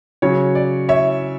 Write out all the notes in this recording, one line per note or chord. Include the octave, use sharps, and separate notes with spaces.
C#3 F#3 C#5
D5
C#5 E5